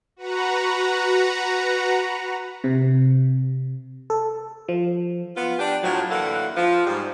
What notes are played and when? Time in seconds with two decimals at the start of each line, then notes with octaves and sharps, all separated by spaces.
0.16 F#4 B4 F#5 A#5
2.64 C3
4.10 A4
4.69 F3
5.36 B3 F4
5.59 D4 G4
5.83 A2 F3 F#3
6.10 A2 D3 E3 A#3 A4 F#5
6.56 F3
6.86 G#2 G3